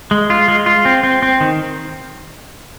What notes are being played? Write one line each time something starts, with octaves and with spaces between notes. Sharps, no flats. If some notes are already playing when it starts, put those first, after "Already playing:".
G#3
F4
G#3
F4
C4
C4
C4
D#3